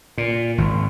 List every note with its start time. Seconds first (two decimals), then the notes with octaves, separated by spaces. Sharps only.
0.18 A#2
0.58 G#1